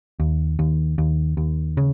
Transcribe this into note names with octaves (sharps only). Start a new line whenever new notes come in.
D#2
D#2
D#2
D#2
C#3